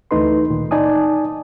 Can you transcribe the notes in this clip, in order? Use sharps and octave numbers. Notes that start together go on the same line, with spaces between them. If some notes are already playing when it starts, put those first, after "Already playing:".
D2 E3 A3 D#4 B4 C6
A#2 D#3
D#4 D5 G#5 A5 D#6